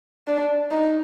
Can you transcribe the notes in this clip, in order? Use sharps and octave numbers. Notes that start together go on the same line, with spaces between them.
D4
D#4